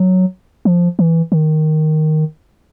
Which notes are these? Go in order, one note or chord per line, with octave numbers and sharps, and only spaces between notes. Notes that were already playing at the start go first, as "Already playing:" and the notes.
Already playing: F#3
F3
E3
D#3